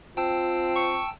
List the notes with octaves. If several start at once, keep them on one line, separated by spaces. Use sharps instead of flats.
C4 F4 G5 A5 E6
C#6